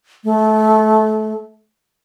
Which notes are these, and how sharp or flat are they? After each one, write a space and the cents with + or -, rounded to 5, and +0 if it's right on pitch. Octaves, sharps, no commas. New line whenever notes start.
A3 -25